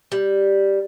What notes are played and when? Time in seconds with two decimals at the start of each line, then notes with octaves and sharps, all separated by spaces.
0.12 G3